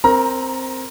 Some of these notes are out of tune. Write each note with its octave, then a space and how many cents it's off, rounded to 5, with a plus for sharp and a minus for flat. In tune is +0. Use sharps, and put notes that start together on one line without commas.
C4 +0 A#4 -5 A#5 +20